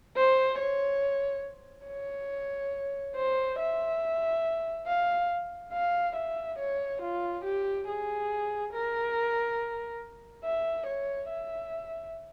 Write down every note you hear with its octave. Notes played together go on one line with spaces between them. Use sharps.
C5
C#5
C#5
C5
E5
F5
F5
E5
C#5
F4
G4
G#4
A#4
E5
C#5
E5